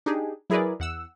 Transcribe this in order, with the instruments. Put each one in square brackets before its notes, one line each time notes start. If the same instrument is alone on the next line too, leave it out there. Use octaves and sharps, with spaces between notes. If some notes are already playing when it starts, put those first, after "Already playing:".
[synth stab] D4 D#4 G4 G#4
F#3 E4 G#4 A#4 B4 D5
E2 F#5 E6